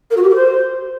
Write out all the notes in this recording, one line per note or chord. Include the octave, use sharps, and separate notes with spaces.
A#4
F#4
G4
A#4
C5